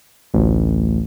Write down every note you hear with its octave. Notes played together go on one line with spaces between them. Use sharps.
A1 D2